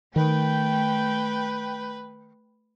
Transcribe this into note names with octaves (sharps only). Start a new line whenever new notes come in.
D#3 A3 B4 G5